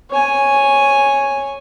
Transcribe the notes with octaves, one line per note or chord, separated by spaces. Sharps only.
C#5 G#5